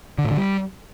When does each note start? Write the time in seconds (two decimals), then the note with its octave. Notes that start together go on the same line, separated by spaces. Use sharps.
0.18 D3
0.25 A2
0.31 D3
0.37 G3